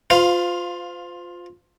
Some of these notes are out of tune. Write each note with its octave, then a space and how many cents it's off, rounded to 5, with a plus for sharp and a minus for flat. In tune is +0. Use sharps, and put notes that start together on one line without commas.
F4 +15 C5 -35 F5 +0